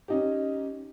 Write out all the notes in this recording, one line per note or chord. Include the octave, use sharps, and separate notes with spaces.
C#4 D#4 G4